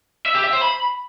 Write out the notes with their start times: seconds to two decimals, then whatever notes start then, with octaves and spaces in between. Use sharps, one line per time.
0.26 E5
0.35 G4
0.44 E5
0.53 C5
0.62 B5